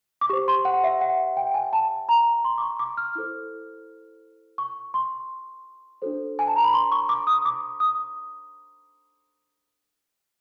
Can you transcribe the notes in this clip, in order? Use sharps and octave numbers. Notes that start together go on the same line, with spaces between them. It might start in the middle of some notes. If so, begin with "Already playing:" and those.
D6
G4 C5 C#6
C6
F#5
E5
F#5
G5
G#5
A5
A#5
C6
D6
C#6
D6
F6
E4 A4 C5
C#6
C6
D4 F#4 A4 C5
G#5
A5
A#5
B5
C6
C#6
D6
D#6
D6
D#6